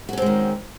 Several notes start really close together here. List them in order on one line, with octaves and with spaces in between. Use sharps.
F#4 C#4 C4 G#3 D#3